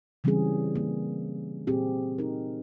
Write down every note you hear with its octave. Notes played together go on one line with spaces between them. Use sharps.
C#3 E3 G3 C4 C#4 G#4
A#3
A#2 C4 G4 G#4
D#4 A#4